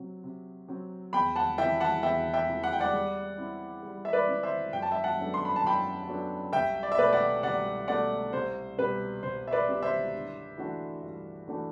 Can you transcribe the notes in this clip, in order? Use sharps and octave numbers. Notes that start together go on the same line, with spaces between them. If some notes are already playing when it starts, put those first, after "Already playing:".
Already playing: C3 F#3 C4
C3
F#3 C4
E2 G5 B5
F#5 A5
C3 E3 E5 G5
F#5 A5
E2 E5 G5
E5 G5
C3 E3
F#5
G5
D5 F#5
G3
C4 E4
G3
E5
B4 D5
C4 E4
C5 E5
F#2 G5
A5
E5 G5
F#5 A5
F#3 B3 D4 A4
C6
B5
A5
F#2 G5 B5
F#3 B3 D4 A4
C2 E5 G5
D5
E5
B2 A3 B4 D5
D5 F#5
C2 D5 F#5
B2 A3 D5 F#5
C2 C5
B2 G3 C4 G4 B4
C2 C5
E5
B4 D5
B2 G3 C4 G4
C5 E5
G2
E3 A3 D4 F#4
G2
E3 A3 D4 F#4